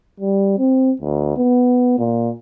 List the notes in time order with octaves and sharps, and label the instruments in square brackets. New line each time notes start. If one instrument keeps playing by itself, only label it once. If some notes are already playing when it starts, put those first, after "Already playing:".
[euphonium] G3
C4
D2
B3
A#2